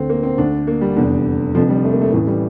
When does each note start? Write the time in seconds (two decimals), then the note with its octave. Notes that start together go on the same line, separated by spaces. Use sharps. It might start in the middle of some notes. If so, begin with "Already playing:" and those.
Already playing: D2 D3 C4
0.09 A#3
0.23 C4
0.38 D2 D3 D4
0.67 A#3
0.81 G3
0.96 F1 E2 D3
1.55 F1 F2 D3 F3
1.69 G3
1.85 A3
1.93 A#3
2.01 A3
2.13 A1 A2 E3 A3
2.27 G3